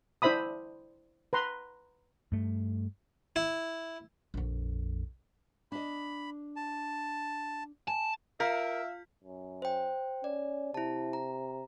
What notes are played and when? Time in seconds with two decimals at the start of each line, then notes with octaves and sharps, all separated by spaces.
0.22 D4 E4 C5 E5 B5 D#6
1.33 B4 A#5 C6
2.32 G2 A3
3.36 E4
4.34 A#1 F2
5.72 D4 D#5 B5
6.56 A5
7.88 G#5 A5
8.40 F4 A#4 E5 F5 F6 B6
9.24 F#2
9.62 C5 G5
10.24 C#4 D5
10.74 C3 E4 A5
11.13 A#5